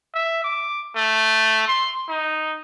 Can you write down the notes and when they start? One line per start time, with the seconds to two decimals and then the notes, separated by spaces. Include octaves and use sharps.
0.14 E5
0.44 D6
0.96 A3
1.68 C6
2.08 D#4